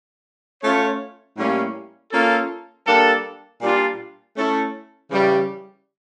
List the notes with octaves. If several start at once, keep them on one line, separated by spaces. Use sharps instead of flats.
A3 C#4 F4 A4 C#5
A2 G3 A#3 C#4
A#3 C#4 F4 A4
G3 A#3 D4 A4
A#2 G3 D4 F4
A3 C#4 E4 A4
C#3 E3 G3